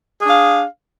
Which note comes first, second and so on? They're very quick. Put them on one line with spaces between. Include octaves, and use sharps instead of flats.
G#4 D4 F5